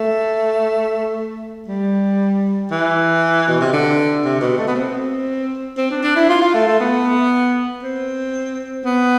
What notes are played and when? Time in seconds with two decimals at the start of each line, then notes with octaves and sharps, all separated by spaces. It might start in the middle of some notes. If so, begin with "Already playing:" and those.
Already playing: A3
1.69 G3
2.71 E3
3.48 B2
3.61 C3
3.73 D3
4.25 C3
4.41 B2
4.59 A3
4.67 B3
4.75 C4
5.77 C4
5.91 D4
6.03 D4
6.16 E4
6.29 F4
6.42 F4
6.54 A3
6.68 A3
6.80 B3
7.83 C4
8.85 B3